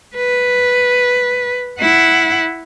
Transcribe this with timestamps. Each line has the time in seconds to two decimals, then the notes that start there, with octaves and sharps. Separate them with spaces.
0.16 B4
1.80 E4 F#5